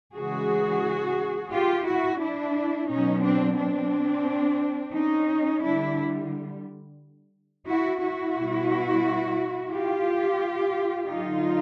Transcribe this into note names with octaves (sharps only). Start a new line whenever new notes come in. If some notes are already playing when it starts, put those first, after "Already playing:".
C#3 E3 G#3 F#4 G#4
F4 G4
E4 F#4
D4 E4
B2 F#3 C#4 D#4
C4 D4
C4 D4
C#4 D#4
D3 G3 D4 E4
E4 F#4
E4 F#4
B2 G3
F4 G4
D3 F#3 D#4 F4